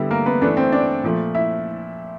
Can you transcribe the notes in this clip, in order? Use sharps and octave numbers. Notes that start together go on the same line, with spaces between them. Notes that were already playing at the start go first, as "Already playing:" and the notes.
Already playing: D3 G3 B3 E4
A#3 A#4
B3 B4
E3 A3 B3 D4 B4
C4 C5
D4 D5
A#2 F3 A3
E4 E5